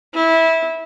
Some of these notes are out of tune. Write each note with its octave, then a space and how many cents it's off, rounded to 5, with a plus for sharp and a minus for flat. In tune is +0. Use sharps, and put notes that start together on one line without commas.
E4 -15